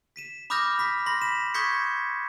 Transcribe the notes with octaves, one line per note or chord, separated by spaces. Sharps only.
B6 D#7 E7
B5 D6 D#6 F6 G6 A#6
B5 B6
B5 C6 A#6
B6 E7
C#6 D#6 G6 G#6 B6 C#7